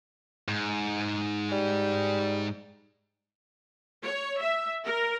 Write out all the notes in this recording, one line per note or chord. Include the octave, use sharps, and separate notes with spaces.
G#2
G3
C#5
E5
A#4